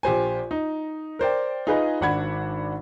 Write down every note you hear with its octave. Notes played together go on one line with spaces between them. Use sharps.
A#1 G4 C5 G#5
D#4
A#4 C5 D5 G5
D#4 F4 G#4 B4 D#5
G#1 D4 F#5 B5 G#6